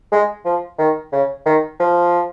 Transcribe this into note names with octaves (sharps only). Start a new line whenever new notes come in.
G#3
F3
D#3
C#3
D#3
F3